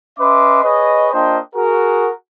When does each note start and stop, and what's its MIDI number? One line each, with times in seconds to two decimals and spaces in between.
0.19 0.61 61
0.19 0.61 71
0.19 0.61 75
0.19 0.61 76
0.19 0.61 84
0.19 0.61 86
0.63 1.08 68
0.63 1.08 71
0.63 1.08 73
0.63 1.08 75
1.12 1.38 58
1.12 1.38 62
1.12 1.38 65
1.12 1.38 72
1.12 1.38 75
1.12 1.38 79
1.55 2.09 66
1.55 2.09 68
1.55 2.09 70